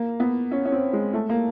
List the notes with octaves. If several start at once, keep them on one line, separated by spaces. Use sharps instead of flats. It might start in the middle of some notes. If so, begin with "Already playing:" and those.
Already playing: A#3
B3
C#4
C#4
C4
G#3
A3
A#3